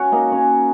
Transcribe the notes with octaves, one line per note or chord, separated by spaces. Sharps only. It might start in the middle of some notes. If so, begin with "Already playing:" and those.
Already playing: C#4 F#4
A#3 D#4
C#4